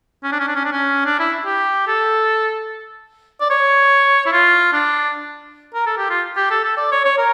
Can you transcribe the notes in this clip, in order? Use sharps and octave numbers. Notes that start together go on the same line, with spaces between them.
C#4
D4
C#4
D4
C#4
D4
C#4
D4
E4
G4
A4
D5
C#5
E4
F4
D4
A#4
A4
G4
F4
G4
A4
A4
D5
C#5
C#5
A#4